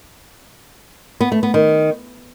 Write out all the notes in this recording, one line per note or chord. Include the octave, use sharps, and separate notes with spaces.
B3
A3
B3
D#3